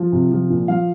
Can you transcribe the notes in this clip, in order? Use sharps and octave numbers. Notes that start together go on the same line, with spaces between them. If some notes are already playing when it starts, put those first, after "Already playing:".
Already playing: F3
C3
F3
A#2
F3 F5